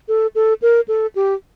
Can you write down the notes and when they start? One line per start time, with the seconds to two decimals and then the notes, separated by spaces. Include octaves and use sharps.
0.08 A4
0.35 A4
0.62 A#4
0.88 A4
1.15 G4